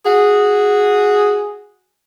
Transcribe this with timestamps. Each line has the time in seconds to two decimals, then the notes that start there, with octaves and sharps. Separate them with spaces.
0.05 F#4 G#4